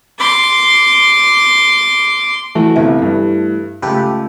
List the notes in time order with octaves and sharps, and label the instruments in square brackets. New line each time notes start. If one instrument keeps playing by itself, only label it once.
[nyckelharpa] C6 D6
[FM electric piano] E3 A3 [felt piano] F#4
[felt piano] G1 C2 E5
G2
[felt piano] C#2 A3 [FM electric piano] G4 A4 B4